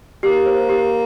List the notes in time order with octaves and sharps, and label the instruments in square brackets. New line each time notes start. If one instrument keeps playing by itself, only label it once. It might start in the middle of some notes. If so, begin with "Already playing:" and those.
[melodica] A#3 [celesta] G4
[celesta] C5
G4